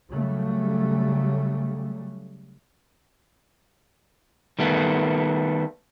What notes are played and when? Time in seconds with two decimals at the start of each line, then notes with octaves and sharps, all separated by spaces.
0.10 C#3 F#3 G3 A3
4.59 D#3 G3 A3 B3